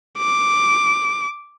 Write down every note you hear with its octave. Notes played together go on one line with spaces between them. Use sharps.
D6